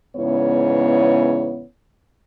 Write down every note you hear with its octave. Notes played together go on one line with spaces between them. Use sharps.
E2 G#2 C#3 B3 E4 C#5